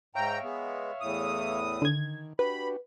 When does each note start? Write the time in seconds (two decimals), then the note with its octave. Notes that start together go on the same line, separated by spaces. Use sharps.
0.15 G#2 C#5 E5 F5 G5 A#5
0.43 G#3 B3
1.01 E2 A2 D#6
1.82 D3 D#3 G#6
2.39 D4 F#4 G4 B4 B5